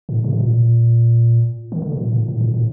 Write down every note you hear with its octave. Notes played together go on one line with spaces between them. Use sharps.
A2
C3
A2
A#2
D#3
D3
C3
A#2
A2
A2
A#2
A2